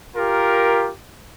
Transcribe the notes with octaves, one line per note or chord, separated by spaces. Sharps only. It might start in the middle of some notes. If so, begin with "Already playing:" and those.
F4 G4 A#4